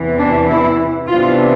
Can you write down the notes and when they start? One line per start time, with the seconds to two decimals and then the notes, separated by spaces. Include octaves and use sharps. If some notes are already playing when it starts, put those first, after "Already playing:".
Already playing: E2 C3 E3
0.18 D4
0.48 E4
1.08 C3 E3 B3 D4 F4